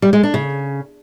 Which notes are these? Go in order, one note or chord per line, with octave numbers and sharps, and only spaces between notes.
G3
G#3
D4
C#3